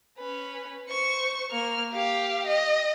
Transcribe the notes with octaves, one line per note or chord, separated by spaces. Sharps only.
C#4 B4
C5 C#6
A#3 F6
G4 F5
D#5